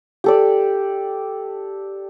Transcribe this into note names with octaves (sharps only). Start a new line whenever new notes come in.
G4 A4 D5